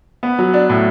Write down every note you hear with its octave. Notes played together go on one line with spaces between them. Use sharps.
B3
F#3
D4
A2